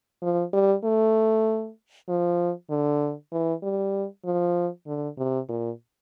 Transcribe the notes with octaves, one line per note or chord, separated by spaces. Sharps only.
F3
G3
A3
F3
D3
E3
G3
F3
D3
C3
A#2